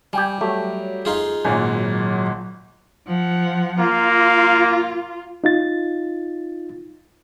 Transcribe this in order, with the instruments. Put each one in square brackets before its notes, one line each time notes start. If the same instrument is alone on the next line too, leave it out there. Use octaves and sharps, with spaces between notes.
[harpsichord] G3 [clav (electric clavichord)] G4 G5 G#5
[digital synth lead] F#3 [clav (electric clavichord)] A3 [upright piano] G4
[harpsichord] D#4 F4 G#4
[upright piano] G#1 A#2 [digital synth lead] F#3 [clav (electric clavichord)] G#5
[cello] F3 F#5
[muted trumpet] A#3 [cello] F4
[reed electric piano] D#4 F4 A6